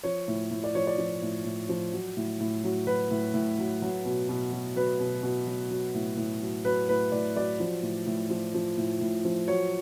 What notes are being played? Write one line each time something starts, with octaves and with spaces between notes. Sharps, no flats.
F3 C#5
A2
A2
D5
F3 C#5
D5
F3
A2
A2
F3
F#3
A2
A2
F#3
F#3 B4
A2
A2
F#3
F#3
B2
B2
F#3
F#3 B4
B2
B2
F#3
F#3
A2
A2
F#3
F#3 B4
A2 B4
A2 D5
F#3 D5
F3
A2
A2
F3
F3
A2
A2
F3
F#3 C#5